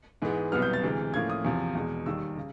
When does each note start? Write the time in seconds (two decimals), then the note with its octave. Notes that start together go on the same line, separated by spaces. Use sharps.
0.22 G#2 E3 G#3 B3
0.52 C2 B2 F#3 B3 F6
0.62 G6
0.73 A6
0.83 D2 C3 E3 G#3
1.14 A2 F3 A#3 C#4 G#6
1.30 D#6
1.45 E2 C3 F3
1.75 E2 B2 G#3
2.06 D#2 D#3 G3 E6
2.37 C#3